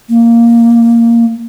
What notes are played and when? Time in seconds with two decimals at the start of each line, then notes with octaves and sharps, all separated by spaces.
0.09 A#3